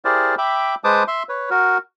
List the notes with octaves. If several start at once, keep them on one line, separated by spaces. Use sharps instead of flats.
E4 G4 G#4 A#4 C5 D5
E5 G5 B5 D6
G#3 B4 C5 A5 D6 D#6
E5 C6
B4 C#5
F#4 A#4